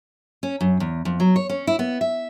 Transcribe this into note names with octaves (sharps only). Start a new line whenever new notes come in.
C#4
F#2
E2
F2
F#3
C#5
C#4
E4
B3
E5